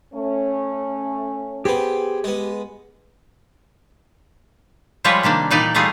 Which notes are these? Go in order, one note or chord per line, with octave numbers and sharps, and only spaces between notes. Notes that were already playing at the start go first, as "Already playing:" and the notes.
A3 C#4
B3 C4 G4 G#4
G#3 B3
F3 G3 G#3 F4 B4 C#5
C3 D#3 A#3 D4
A#2 E3 D#4 B4 D5
G3 A3 D#4 F4 G#4